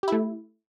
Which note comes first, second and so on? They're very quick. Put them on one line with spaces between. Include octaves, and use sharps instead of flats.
G4 E4 A3